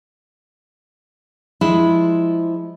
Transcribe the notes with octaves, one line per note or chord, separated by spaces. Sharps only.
F3 G#3 E4